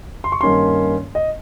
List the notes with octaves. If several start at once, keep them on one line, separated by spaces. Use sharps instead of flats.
C6
C#6
G2 D#3 A#3 C#4 C6
D#5